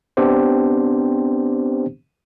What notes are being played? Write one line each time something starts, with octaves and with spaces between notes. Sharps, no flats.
B3 C4 D4 G4 C5